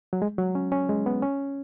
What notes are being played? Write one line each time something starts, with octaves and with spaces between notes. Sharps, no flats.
F#3
G#3
F#3
C#4
C#4
G#3
B3
C#4